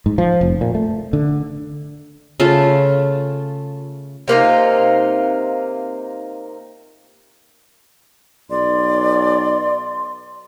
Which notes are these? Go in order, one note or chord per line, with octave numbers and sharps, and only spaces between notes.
G#2
F3
F1
A#2
A3
D3
C#3 A3 F4 A4
C3 A#3 D#4 F4
B1 D5 C6